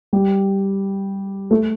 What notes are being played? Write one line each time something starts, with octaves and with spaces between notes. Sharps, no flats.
G3 G4
A3 A4